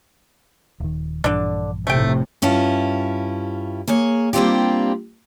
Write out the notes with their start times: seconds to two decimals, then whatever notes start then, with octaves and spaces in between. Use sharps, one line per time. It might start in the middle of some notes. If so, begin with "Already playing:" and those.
0.80 D#1 D#3
1.24 A#1 G2 D3 E3 D4
1.87 F1 A2 C3 A3 G5
2.42 G2 C#4 E4 F4 A5
3.88 A#3 G#4 C#5
4.33 G3 A#3 C4 D4 F4 G4